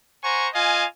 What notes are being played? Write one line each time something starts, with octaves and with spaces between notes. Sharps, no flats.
C5 F#5 G#5 A#5 C#6
F4 D#5 F5 G#5